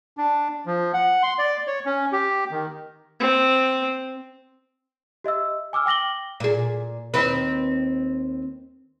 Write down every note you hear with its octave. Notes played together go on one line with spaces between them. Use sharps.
D4
F3
F#5
C6
D5
C#5
C#4
G4
D#3
C4
G4 D#5 E5 E6
G#5 D6 E6 F6
G5 D6 A#6 F#7 G7
A#2 G#4
D#2 C4 B4